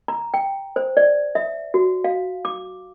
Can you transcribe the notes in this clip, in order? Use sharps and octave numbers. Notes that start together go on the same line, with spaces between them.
A#5
G5
C5
D5
E5
F#4
F5
D6